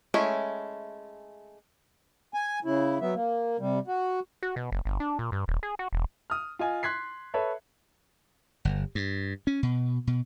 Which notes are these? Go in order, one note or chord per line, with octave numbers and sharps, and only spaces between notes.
G#3 A3 C#4 E4
G#5
C#3 E4
F#3 B3 E5
A#3
C3 G3
F#4
F#4
B2
F#1
G1
D4
A#2
G2
D#1
G#4
F#4
E1
D#6 F6
F4 D#5 G#5
C6 F#6 G#6 B6 C7
A4 B4 C#5 E5
G1
G2
C#4
B2
B2